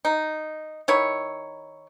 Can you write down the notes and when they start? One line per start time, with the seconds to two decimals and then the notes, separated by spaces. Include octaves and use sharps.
0.05 D#4
0.88 D#3 E4 C#5